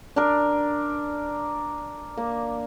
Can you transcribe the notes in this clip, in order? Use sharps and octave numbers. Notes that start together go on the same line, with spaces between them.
D4 A#4
A#3